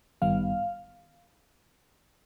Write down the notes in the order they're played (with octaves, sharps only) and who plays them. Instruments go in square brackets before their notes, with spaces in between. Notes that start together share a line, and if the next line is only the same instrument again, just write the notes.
[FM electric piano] G#1 G2 D#3 G3 B3 F5